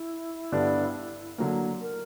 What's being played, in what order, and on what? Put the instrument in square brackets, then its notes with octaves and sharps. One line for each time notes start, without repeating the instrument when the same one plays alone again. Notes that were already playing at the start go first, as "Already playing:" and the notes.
Already playing: [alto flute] E4
[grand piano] G2 D3 G3 B3 D4
D3 F#3 A#3
[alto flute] A#4